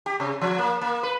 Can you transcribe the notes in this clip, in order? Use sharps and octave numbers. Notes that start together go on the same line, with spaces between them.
G4
C3
F3
A#3
A#3
B4